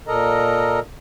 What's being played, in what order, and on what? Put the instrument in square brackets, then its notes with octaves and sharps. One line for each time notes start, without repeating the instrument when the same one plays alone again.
[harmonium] A#2 A4 A#4 D#5 A#5